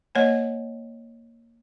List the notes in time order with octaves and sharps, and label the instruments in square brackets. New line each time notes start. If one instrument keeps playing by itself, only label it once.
[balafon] A#3 C#5 D#5 G#5